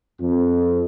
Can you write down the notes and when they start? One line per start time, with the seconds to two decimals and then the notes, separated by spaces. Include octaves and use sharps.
0.20 F2